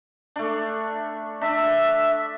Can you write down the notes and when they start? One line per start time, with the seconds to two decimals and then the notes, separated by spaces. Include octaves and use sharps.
0.36 A3 D4
1.42 D4 E5